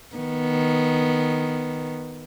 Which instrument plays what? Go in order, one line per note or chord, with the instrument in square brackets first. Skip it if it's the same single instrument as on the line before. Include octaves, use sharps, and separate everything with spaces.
[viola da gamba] D#3 B3